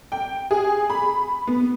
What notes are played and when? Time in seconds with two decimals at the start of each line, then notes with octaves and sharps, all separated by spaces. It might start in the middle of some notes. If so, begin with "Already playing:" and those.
0.12 G5
0.51 G#4
0.90 B5
1.47 B3